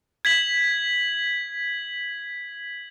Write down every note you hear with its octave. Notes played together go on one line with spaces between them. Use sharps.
G#6 B6 F#7